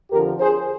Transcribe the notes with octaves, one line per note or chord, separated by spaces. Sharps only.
F2 D3 F3 G4 A#4
G#4 C5